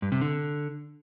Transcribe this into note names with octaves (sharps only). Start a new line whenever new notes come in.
G2
C3
D3